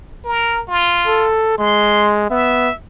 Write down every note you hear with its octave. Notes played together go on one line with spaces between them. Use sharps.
A#4
F4
A4
G#3 C6
B3 E5